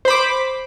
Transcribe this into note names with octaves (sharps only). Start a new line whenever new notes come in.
C5 B5 D6